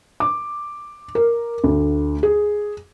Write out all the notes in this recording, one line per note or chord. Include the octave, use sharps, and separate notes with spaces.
D6
A#4
D2
G#4